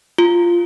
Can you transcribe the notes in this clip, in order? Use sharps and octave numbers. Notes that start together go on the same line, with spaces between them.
F4